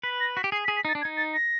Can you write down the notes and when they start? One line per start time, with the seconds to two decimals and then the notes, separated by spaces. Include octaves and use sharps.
0.03 B4 B6
0.20 A#6
0.36 F#4 B6
0.44 G4
0.52 G#4 C7
0.64 B6
0.68 G#4
0.76 B6
0.85 D#4 A6
0.95 D4
1.02 G#6
1.05 D#4
1.17 A6
1.33 A#6